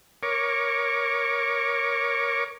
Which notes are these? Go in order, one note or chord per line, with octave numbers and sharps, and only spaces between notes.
A#4 C#5 C#6 D6